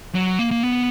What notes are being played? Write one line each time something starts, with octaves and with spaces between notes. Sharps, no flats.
F#3
A#3
A#3
B3